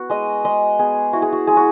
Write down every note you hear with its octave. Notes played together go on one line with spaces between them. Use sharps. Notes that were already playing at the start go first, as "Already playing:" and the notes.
Already playing: B3 F#4
G#3 D#5
G#3 D#5
B3 G#4
E4 F#4
G#4
F#4
G#3 G#4
F#4